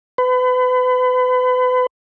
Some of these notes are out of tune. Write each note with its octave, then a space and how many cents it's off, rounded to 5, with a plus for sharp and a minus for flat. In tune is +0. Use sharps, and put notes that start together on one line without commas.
B4 +35